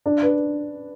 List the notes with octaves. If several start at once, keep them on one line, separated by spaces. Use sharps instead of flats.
D4
B4